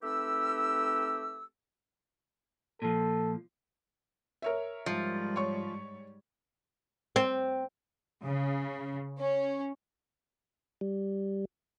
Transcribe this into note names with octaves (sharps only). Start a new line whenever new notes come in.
A3 C4 D#4 G4 B4 E6
A#2 F3 A4
A#4 C#5 E5
G#2 F3 G3
C#5 C#6
C4
C#3
C#4
G3